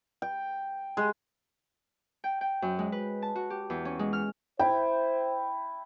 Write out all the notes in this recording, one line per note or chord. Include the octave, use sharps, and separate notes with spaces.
G5
G#3
G5
G5
F#2
G#3
B4
A5
F#4
G4
E2
C#4
G#3
F6
E4 C5 G5